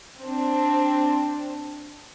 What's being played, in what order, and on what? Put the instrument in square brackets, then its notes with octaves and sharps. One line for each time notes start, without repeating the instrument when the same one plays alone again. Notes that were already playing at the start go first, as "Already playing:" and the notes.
[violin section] C4 D4